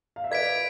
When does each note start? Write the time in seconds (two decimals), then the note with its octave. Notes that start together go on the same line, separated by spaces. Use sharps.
0.16 F5
0.24 E5
0.31 B4 D5 G#6 B6 D7